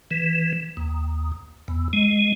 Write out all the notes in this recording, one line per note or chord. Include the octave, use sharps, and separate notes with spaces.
E3
D#2
E2
G#3